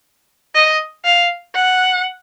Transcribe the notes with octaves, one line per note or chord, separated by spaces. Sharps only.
D#5
F5
F#5